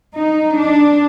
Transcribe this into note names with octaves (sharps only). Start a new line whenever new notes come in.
D#4
D4